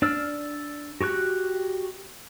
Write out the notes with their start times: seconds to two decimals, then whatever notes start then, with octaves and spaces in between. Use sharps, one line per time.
0.02 D4 D5 E6 F6
1.01 F#4 G4 C#6 F#6